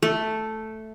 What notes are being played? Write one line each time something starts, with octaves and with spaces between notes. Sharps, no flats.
A3